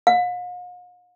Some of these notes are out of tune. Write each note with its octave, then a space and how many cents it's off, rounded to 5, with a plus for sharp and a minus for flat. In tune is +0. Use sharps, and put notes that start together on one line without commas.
F5 +45